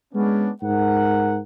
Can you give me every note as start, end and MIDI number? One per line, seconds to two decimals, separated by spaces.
0.14 0.50 56
0.14 0.50 59
0.14 0.50 61
0.14 0.50 62
0.62 1.38 44
0.62 1.38 70
0.62 1.38 78